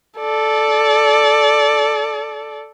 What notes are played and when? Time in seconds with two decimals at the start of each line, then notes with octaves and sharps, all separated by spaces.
0.20 A4 D5